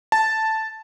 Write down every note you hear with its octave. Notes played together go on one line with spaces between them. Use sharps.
A5